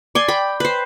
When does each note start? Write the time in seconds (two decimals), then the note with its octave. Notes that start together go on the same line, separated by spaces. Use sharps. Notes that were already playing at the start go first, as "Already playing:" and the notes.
0.15 D5 G#5 C6
0.28 G5 B5
0.60 B4 C5